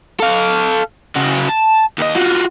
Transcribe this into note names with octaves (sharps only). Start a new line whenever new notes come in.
A4 F5
C#3 F#4
A5
D#2 D#5
F4 F#4